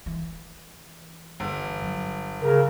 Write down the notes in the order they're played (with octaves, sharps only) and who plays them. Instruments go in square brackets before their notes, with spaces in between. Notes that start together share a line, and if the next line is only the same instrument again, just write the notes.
[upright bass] E3
[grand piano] G1
[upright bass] F#3
[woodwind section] C#3 [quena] A#4